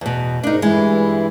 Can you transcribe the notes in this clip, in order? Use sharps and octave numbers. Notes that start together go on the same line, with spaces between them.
E2 B2
G#2 D4 D#4 A#4
G2 E3 G#3 E4